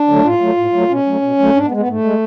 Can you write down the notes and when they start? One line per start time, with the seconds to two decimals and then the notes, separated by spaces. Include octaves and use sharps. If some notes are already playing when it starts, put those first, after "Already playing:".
Already playing: D4
0.08 D3 F#3 A3
0.24 A2 F4
0.41 F#3 A3
0.57 A2
0.73 F#3 A3
0.89 B2 C#4
1.06 F#3 A3
1.22 B2
1.39 F#3 A3
1.55 G#2 D4
1.66 B3
1.71 G#3
1.77 B3
1.88 G#2 A3
2.04 G#3